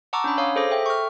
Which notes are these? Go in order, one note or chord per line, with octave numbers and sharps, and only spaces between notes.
F#5 A5 A#5 C#6 D6 E6
C#4 D4 B5
C#5 F5 D#6
G#4 A4 C5 D6 A#6
A4 E5 G5
C#6 F6